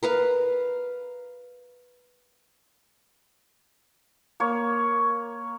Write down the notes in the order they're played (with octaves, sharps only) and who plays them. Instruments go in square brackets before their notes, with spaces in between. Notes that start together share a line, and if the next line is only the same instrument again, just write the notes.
[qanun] A#4 B4 F5
[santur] A#3 C#5